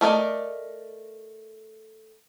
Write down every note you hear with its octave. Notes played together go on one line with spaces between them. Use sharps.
A3 A#4 D5 D#5